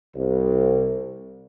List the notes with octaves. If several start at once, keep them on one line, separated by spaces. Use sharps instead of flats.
C2